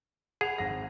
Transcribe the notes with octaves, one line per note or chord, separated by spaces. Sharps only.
G#4 F#5 B5 F7
G#1 F#5 A#6